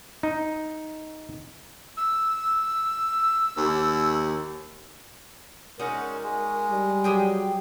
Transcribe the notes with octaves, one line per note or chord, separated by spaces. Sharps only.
D#4
E6
D#2
G#3 C#4 D#4 F#4 A#4 D5
G#3
G3
F#3 G4 G#4 G5